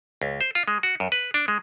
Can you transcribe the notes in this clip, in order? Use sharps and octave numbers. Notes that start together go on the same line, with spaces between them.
C#2
C5
F4
G#3
F#4
F#2
B4
D4
G#3